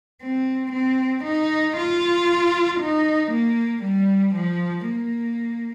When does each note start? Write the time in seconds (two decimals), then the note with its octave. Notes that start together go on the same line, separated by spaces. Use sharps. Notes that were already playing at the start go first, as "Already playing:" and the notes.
0.22 C4
0.73 C4
1.25 D#4
1.77 F4
2.80 D#4
3.31 A#3
3.83 G3
4.35 F3
4.86 A#3